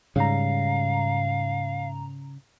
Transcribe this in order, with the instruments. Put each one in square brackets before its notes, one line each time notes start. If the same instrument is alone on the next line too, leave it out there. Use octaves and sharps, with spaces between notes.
[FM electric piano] G#2 A#5 [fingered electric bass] C#3 G3 [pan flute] F5